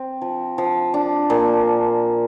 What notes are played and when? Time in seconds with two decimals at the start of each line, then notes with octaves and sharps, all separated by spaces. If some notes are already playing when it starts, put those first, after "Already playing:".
Already playing: C4
0.22 F3
0.58 F3
0.94 D4
1.30 A#2